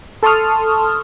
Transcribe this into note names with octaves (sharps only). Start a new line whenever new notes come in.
A4 A5 C6 C#6 D#6 F6